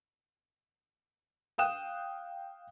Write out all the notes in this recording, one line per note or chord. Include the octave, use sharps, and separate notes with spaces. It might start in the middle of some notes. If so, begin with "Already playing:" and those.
F5 G5 D#6 F#6 E7